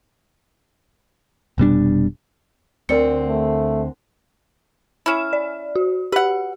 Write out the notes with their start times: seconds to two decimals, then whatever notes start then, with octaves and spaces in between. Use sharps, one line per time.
1.58 F1 B2 G3 D4
2.89 D2 D3 C4 A#4 D5 C#7
3.28 A3
5.06 C#4 E4 B5 F6 E7
5.33 D5
5.76 F#4
6.12 G4 B4 F#5